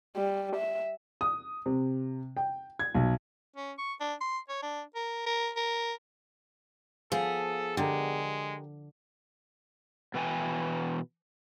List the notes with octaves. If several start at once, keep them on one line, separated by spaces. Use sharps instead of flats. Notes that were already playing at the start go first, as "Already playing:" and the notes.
G3
E5
D#6
C3
G5
G#6
B1
C#4
C#6
D4
C6
C#5
D4
A#4
A#4
A#4
F3 B3 G#4 A4
D3 G#3 G4 A#4
B2 E3 B4 G5 G#5